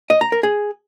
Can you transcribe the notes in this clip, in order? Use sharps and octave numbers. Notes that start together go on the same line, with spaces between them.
D#5
A#5
A#4
G#4